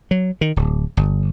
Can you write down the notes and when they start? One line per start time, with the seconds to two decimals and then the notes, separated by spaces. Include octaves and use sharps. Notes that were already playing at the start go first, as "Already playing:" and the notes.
0.11 F#3
0.41 D#3
0.56 D1
0.97 G1